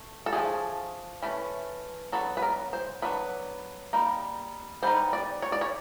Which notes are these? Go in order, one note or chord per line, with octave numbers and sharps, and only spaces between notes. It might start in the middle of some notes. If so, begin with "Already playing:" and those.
Already playing: A3
A4
F3 A3 D4 G#4
E3 A3 C#4
F#3 B3 D4 A4
B4
A#4
C5
F#3 B3 D4 B4
G3 A#3 D#4
G3 B3 D#4 C5
D5
C#5
D5
C#5